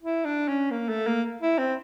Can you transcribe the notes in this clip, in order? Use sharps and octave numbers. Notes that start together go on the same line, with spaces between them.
E4
D4
C#4
A#3
A3
A#3
E4
C4